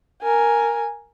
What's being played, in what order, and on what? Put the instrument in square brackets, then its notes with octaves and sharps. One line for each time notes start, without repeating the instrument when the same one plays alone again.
[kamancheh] A#4 G#5